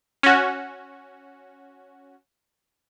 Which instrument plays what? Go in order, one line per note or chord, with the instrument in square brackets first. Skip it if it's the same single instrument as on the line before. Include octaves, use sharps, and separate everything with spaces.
[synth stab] C#4 F#4